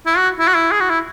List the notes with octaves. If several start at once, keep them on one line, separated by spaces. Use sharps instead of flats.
E4
F#4
E4
F#4
E4
G#4
F#4
E4